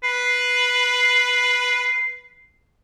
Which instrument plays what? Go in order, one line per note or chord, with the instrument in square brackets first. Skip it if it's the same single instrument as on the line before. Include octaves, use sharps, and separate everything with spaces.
[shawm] B4 [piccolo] C7